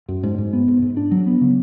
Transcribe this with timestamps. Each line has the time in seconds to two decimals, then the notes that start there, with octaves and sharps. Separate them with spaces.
0.09 F#2
0.23 G#2
0.38 G#2
0.53 B3
0.68 G#2
0.82 G#2
0.97 D4
1.11 F#3
1.27 B3
1.41 C#3